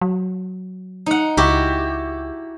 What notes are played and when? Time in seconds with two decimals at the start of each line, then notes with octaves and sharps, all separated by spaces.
0.01 F#3
1.06 D#4 F#5
1.37 C#2 E4 F#4 G4